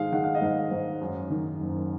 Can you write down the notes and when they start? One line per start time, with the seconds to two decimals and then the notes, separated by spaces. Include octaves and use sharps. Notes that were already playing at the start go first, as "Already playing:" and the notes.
Already playing: G#2 D#3 G#3 F5
0.12 D#3 F#5
0.24 F5
0.35 D#5
0.42 G#2 F5
0.71 G#2
1.01 F#2
1.30 D#3
1.60 F#1